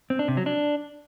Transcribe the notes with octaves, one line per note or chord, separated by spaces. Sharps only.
C4
D4
C3
F#3
D4